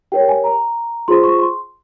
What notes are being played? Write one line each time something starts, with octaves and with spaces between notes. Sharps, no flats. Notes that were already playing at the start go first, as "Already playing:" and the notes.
G4 A#4 C#5 G5
G#5
A#5
F4 G#4 C5 C6
C#6
C6